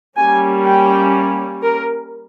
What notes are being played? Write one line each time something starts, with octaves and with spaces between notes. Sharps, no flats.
G3 A#3 C#4 G#5
G5
A#4